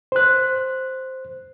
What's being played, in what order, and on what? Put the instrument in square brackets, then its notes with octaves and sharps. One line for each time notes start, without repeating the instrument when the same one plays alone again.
[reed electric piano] C5 F#6